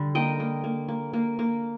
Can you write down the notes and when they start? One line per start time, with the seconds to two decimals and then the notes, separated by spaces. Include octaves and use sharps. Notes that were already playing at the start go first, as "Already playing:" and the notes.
Already playing: D3 G3
0.15 A#3 D#5 G5
0.40 A#3
0.64 A#3
0.88 A#3
1.13 A#3
1.39 A#3